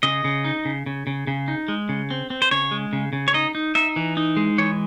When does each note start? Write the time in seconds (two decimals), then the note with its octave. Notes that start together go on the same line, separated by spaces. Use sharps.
0.03 C#3 D#5
0.24 C#3
0.44 D#4
0.65 C#3
0.86 C#3
1.07 C#3
1.27 C#3
1.48 D#4
1.68 G#3
1.89 C#3
2.11 C4
2.30 C4
2.42 C5
2.51 C#3 C#5
2.71 G#3
2.93 C#3
3.13 C#3
3.28 C#5
3.34 D#4 D#5
3.55 D#4
3.75 D#4 E5
3.96 E3
4.17 D#4
4.37 G#3
4.58 E3 C#5